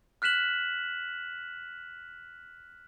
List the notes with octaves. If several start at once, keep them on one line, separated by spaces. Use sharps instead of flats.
F6 F#6 B6 E7 F#7